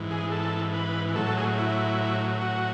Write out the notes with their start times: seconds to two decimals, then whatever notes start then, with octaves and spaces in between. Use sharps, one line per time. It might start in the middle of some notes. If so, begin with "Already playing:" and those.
Already playing: G#2 E3
0.11 G#4
0.32 A4
0.74 B4
1.15 A2 F#3 A4
1.26 A4
1.37 G#4
1.58 E4
2.41 F#4